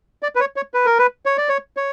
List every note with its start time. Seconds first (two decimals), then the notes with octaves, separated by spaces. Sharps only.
0.23 D5
0.35 B4
0.40 C#5
0.56 C#5
0.74 B4
0.86 A#4
0.98 B4
1.26 C#5
1.38 D5
1.49 C#5
1.77 C#5